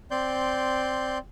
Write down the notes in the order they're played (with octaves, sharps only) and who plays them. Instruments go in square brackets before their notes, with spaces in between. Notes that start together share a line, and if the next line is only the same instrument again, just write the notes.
[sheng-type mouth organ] C4 D5 C6 G6